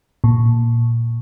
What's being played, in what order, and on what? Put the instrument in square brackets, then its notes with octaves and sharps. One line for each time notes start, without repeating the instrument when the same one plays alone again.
[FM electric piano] A#2